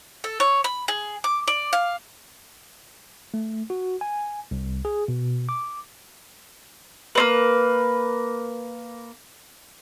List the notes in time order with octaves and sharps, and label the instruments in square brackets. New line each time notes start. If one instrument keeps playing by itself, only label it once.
[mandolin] A4
C#5
B5
G#4
D6
D5
F5
[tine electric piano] A3
F#4
G#5
C2
G#4
B2
D6
[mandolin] A#3 C4 B4